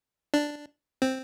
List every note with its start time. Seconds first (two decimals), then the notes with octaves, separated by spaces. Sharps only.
0.34 D4
1.02 C4